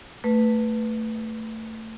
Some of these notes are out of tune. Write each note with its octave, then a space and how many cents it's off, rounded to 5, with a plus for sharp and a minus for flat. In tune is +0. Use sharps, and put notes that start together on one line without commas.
A3 +15 B4 +0